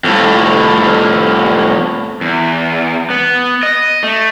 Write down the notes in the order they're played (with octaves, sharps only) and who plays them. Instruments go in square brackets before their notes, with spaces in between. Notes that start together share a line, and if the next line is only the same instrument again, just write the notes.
[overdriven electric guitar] F2 A2
[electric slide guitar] E2
B3
D#5
A3